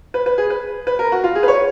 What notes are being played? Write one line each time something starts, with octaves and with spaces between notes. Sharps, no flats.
B4
B4
G#4
B4
B4
A#4
F#4
F4
G#4
B4
C#5